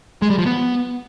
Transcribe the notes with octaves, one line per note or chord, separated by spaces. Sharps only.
G#3
G3
F3
B3